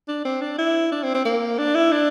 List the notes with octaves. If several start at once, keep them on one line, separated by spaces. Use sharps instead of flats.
D4
C4
D4
E4
D4
C4
C4
A#3
D4
E4
D4